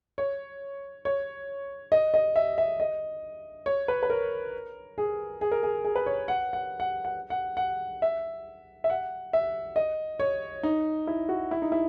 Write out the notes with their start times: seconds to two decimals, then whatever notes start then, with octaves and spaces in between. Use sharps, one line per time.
0.18 C#5
1.05 C#5
1.92 D#5
2.14 D#5
2.36 E5
2.58 E5
2.80 D#5
3.66 C#5
3.88 B4
4.03 B4
4.10 A#4
4.98 G#4
5.41 G#4
5.52 A#4
5.63 G#4
5.84 G#4
5.96 B4
6.06 C#5
6.28 F#5
6.53 F#5
6.80 F#5
7.05 F#5
7.30 F#5
7.57 F#5
8.02 E5
8.84 E5
8.90 F#5
9.33 E5
9.76 D#5
10.20 C#5
10.63 D#4
11.07 E4
11.29 F#4
11.51 E4
11.62 D#4
11.72 E4